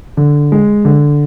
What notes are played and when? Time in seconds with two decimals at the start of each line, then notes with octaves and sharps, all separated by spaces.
0.17 D3
0.52 G#3
0.85 D3